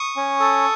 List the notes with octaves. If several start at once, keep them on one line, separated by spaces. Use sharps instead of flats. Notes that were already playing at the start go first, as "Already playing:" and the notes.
Already playing: C#6 D#6
C#4
A4